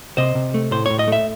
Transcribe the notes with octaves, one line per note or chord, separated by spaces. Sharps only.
C3 C5 D#5
C3
A3
A2 C5
A2 C#5
D#5
A3 E5